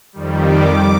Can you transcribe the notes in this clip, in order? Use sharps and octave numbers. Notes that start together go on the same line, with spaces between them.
F2 D#3 G3
D6